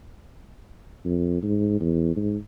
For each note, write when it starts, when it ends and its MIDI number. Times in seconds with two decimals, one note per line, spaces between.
1.05 1.40 41
1.43 1.79 44
1.80 2.13 40
2.16 2.36 44